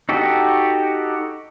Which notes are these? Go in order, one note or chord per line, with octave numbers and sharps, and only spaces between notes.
D#4 F#4 G4 A4